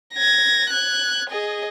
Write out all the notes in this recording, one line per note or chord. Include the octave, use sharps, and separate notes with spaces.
G#6 A#6
F#6 G#6
G#4 D#5